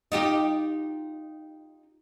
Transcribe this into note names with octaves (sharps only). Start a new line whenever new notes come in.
D#4 F4 G4